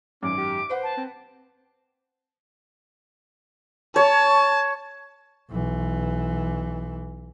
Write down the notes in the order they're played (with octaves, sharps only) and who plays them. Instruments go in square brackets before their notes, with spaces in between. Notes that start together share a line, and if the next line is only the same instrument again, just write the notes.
[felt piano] G#1 F#2 [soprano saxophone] C#4 [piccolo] D6
[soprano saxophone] G4
[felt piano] B4 F#5 [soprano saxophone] C5
[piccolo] A5
[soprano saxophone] C4
[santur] C#5 [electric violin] A5
[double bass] B1 E3